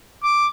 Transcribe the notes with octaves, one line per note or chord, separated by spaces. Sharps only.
D6